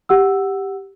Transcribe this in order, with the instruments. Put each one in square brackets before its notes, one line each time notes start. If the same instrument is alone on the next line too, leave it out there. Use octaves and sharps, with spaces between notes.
[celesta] G4 F#5 E6